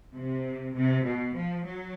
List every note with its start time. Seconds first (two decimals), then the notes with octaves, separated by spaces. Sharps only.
0.14 C3
0.74 C3
1.05 B2
1.35 F3
1.65 F#3